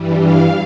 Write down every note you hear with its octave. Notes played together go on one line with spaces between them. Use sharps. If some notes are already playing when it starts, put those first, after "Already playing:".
Already playing: G2 E3 G3
F5